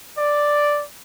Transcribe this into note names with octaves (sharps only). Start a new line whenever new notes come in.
D5